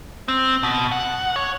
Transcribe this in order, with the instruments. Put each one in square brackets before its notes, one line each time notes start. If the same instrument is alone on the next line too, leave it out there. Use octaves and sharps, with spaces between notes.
[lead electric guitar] C4
B2
F#5
C#5